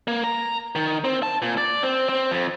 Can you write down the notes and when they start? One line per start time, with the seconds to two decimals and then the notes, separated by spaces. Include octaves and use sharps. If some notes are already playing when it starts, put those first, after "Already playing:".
0.08 A#3
0.24 A#5
0.75 D#3
1.04 C4
1.23 A5
1.42 A#2
1.58 D5
1.83 C4
2.09 C4
2.31 F2